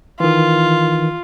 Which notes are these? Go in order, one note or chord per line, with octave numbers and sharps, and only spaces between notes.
D#3 E3 F4